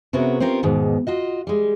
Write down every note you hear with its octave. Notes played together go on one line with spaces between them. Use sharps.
C3 B3 C#4 F#4 G#4 A#4
C4 C#4 F4 G4 A#4
E2 G#2 B2 D#3
F4 F#4 D#5
G3 G#3